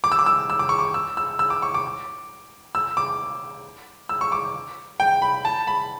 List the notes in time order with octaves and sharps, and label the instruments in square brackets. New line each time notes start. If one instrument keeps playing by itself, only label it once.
[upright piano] D6
E6
D6
E6
E6
D6
C#6
D6
E6
E6
E6
D6
C#6
D6
E6
D6
E6
C#6
D6
G5
B5
A5
B5